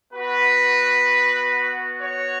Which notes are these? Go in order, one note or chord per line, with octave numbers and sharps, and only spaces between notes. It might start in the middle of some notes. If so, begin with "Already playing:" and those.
B3 F#4 B4
C#5